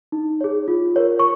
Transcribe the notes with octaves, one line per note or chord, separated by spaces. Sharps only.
D#4
G#4 C#5
F4
A#4 C#5
C#6